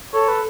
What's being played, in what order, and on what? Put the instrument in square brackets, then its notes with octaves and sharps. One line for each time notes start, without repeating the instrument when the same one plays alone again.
[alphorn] A4 [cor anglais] C#5
[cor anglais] B4